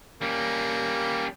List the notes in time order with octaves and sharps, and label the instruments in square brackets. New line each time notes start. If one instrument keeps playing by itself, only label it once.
[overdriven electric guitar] G3 C#4 [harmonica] A#3